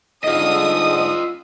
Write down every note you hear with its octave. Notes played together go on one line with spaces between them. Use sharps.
G#2 D3 F4 D#5 D#6